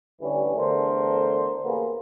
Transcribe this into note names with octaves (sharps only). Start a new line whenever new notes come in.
A1 D3 E3 G3 C#4
E2 D3 A3 A#4 C5
A1 A#3 B3 G#4